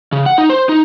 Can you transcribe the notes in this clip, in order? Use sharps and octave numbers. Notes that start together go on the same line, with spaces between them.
C#3
F#5
D#4
C5
D#4